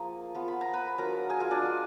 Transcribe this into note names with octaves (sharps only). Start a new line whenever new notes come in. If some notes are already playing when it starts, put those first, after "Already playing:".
Already playing: F3 A#3 F4 G#4 A#5
F3 B3 F4
B5
A#5
B4 B5
F#3 D4 F4 A#4 A#5
G#4 G#5
F4 F5
D4 D5
G#3 D4 F4